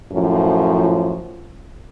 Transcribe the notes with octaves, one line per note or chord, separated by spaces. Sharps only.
F#2 A2 F3